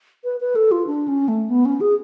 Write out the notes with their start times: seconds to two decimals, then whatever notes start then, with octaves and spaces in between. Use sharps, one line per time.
0.24 B4
0.40 B4
0.55 A4
0.71 F4
0.87 D4
1.08 C#4
1.28 A3
1.50 B3
1.65 C#4
1.81 G#4